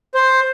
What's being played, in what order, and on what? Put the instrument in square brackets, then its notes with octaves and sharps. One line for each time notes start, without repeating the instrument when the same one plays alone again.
[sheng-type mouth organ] C5